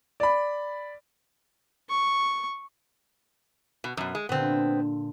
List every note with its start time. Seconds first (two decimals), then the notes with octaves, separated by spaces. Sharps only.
0.20 D5 B5
1.89 C#6
3.84 B2
3.97 F#2 B2
4.15 G#3
4.29 A#2 D3 B3 C4